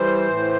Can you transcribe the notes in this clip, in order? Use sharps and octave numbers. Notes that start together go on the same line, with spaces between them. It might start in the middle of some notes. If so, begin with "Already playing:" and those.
Already playing: E3 G3 C5
A2